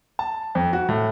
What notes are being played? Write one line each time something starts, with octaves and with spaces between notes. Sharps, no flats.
A5
F2
F#4
A2